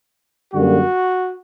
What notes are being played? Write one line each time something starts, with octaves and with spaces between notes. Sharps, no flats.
F#2 D3 G3 A#3 F#4